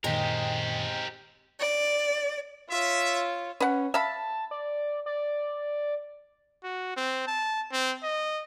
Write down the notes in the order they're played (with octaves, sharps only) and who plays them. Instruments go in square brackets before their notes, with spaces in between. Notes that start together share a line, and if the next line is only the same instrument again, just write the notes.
[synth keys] F#2 A#2 D#3 [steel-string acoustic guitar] G#3 C4 G#4 [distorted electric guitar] G4 A#4
[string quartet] D5
[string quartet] F4 C#5 [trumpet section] E5
[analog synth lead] C#4 [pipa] B4 F#5
[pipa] E5 F5 B5 [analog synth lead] A5
[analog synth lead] D5
D5
[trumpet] F#4
C4
A5
C4
D#5